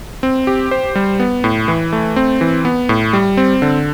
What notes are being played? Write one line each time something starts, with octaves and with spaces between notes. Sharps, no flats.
C4
G4
C5
G3
B3
A2
E3
A3
C4
E3
B3
A2
G3
C4
D3